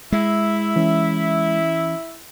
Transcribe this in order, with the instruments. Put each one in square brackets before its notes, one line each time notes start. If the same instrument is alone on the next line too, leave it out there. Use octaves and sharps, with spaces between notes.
[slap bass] G#3 [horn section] E4 E5
[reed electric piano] E3 C#4